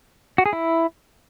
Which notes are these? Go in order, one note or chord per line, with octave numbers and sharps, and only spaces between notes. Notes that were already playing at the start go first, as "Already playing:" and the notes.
F#4
G#4
E4